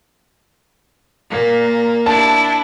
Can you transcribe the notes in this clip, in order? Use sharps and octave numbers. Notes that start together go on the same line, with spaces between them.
A#2 A#3
D4 E4 A5